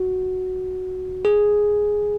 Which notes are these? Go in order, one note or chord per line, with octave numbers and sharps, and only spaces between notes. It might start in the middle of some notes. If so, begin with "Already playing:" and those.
Already playing: F#4
G#4